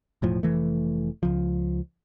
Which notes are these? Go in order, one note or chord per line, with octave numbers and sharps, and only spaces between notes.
E1 A2 F3
F1 E3 A3
C#2 F3